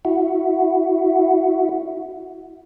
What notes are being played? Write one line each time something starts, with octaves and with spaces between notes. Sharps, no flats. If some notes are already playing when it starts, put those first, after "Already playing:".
E4 F#4